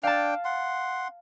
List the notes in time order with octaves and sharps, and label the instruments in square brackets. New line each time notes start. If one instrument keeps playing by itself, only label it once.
[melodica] D4 G5 [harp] F5 A5
[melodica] F#5 C6